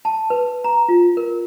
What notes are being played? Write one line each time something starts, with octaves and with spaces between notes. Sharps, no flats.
A5
B4
A#5
F4
A#4